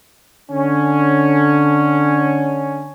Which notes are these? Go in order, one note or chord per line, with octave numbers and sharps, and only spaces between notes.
D3 C#4